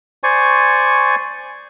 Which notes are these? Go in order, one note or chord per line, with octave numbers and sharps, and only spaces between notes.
C5 D5 G#5 C#6